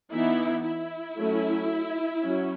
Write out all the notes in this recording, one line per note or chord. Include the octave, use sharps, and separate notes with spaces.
E3 B3 D#4 E4
E4
F#3 A3 C#4
F#3 C#4